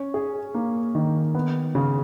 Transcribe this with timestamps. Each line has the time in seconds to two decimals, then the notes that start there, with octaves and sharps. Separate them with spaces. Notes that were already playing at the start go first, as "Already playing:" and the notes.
Already playing: C#4
0.14 G#4
0.54 A#3
0.95 D#3
1.35 B3
1.75 C#3